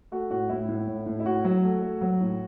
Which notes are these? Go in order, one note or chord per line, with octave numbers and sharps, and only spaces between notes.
A3 F#4
A2 F#4
A2 E4
A2
A2
A2
E4
A2 F#4
F#3
A3
A3
F#3
A2